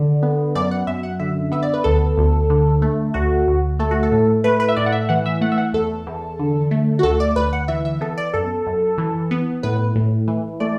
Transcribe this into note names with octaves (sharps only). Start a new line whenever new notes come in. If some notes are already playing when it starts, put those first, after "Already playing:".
Already playing: D3
B3
F#2 D5
F#5
F#2 E5
F#5
D3 E5
B3 E5
D5
B4
D2 A4
D2
D3
A3
D2 F#4
D2
A3 A4
F#4
A4
A2
A3 B4
B4
E5
A2 D5
F#5
E5
E3 F#5
E5
A3 F#5
E5
F#5
E2 A4
E2
D3
A3
F#4
D2 A4
D5
D2 B4
F#5
E3 E5
E5
B3 A4
D5
F#2 A4
F#2
E3
B3
A2 B4
A2
E3
A3 D5